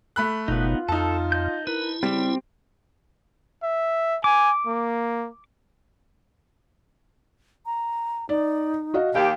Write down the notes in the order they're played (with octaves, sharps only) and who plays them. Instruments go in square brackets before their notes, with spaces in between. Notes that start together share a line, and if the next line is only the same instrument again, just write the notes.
[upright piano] A3 B5 F#6
[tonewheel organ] F#1 B2 [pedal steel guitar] B3 D#4 [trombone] F4
[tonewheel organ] F2 [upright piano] D#4 A5 [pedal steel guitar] A4
[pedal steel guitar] D#5 G6
[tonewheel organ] E4 [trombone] A#4 [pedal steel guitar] B4
[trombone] C#3 [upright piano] G3 [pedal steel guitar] C4 G4
[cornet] E5
[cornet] G#5 [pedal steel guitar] D6
[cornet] A#3
[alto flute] A#5
[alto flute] D#4 [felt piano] D5
[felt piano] F#4 D#5 F5
[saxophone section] D#2 G4 [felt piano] F5